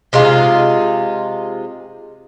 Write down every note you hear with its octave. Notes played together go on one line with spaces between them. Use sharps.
C3 G#3 D#4 F4